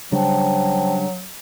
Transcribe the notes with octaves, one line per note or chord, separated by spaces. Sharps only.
C#3 F#3 G3 D4 C5 G5 A5